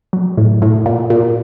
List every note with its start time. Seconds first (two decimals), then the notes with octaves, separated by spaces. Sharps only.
0.13 F#3
0.37 A2
0.62 A2
0.86 A#2
1.10 A#2